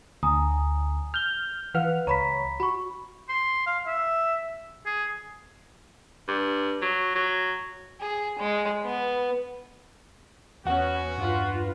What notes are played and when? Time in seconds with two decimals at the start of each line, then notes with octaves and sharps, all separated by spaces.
0.23 D2 G#5 A#5 D#6
1.14 F6 G6 G7
1.74 E3 B4 F5 F#5 F6
2.07 C#2 C#5 A#5 B5 B6
2.60 F#4 B5 C#6
3.29 C6
3.67 F5
3.87 E5
4.86 G#4
6.28 G2
6.82 F#3
7.15 F#3
8.01 G#4
8.39 G#3
8.85 B3
10.65 E2 B3 C#4 F#4 F#5
11.18 G2 F4 B4